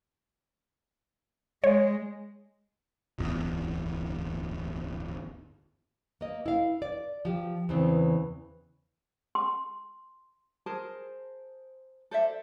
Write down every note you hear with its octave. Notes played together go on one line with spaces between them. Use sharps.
G#3 C#5
D1 G1 E2
A#3 D#5
E4 F5
D5
F3 G4
E2 C#3 E3 C4
C6
G#4 A#4 C5 A5
A4 C5 D5 E5